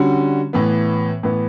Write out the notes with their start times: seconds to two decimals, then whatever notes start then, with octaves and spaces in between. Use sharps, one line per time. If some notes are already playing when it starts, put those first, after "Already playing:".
Already playing: D3 G3 C#4 F#4
0.53 A2 E3 B3
1.23 A2 E3 B3